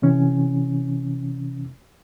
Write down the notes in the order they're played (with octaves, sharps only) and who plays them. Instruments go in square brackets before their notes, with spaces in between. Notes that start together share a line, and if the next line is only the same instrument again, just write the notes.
[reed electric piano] C3 E3 C#4